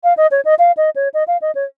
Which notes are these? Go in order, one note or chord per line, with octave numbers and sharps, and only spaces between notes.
F5
D#5
C#5
D#5
F5
D#5
C#5
D#5
F5
D#5
C#5